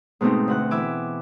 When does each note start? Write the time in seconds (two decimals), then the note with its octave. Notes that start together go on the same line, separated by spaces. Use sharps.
0.21 G#2 B2 A3 C4 D#4
0.48 D2 F#5 F#6
0.71 E3 E4 E5 G#5 D6